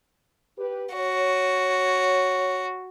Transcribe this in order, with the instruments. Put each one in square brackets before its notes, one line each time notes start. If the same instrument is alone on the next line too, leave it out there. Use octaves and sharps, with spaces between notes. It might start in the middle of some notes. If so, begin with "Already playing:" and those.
[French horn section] G4 B4
[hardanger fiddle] F#4 [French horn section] C#5